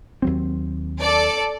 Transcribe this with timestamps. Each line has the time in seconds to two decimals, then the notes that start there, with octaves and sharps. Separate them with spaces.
0.22 D#2 F#3 C4
1.00 A4 D5